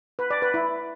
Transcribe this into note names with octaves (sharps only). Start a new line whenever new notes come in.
B4
D5
B4
E4